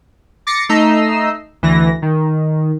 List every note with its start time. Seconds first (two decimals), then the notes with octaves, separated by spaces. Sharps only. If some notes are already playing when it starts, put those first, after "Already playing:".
0.47 D6 A6 A#6 C7 C#7
0.69 A3 D#4 D#5 A#5 E6 C7
1.62 D2 E3 A#6
2.02 D#3